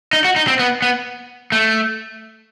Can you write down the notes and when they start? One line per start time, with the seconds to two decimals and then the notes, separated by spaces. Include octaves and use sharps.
0.13 D#4
0.24 F#4
0.36 D#4
0.47 C4
0.59 B3
0.82 B3
1.52 A3